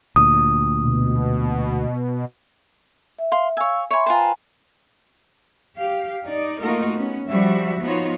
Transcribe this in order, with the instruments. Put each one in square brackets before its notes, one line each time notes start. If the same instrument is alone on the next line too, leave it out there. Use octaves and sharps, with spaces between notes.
[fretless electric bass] D2 A#2 [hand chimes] D#6
[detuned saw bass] B2
[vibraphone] E5
[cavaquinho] F5 C6
[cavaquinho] C#5 G#5 [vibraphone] F5 E6
[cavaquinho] C#5 G#5 [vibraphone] E5 B5 C6
[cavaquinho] F4 B4 C5 [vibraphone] G5 G#5 A#5
[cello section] G4 F5
D#4 D5
A3 A#3 D#4 F4 F#4 A#4
B3 C#4
F3 G3 F#4 E5
F3 B3 D#4 F4 F#4 C#5